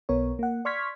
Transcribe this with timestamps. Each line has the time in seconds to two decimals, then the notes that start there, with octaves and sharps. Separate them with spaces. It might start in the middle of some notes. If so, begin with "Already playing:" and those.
0.09 B1 B3 A#4 C#5
0.39 A#3 F#5
0.65 D5 C6 C#6 F6 G#6 B6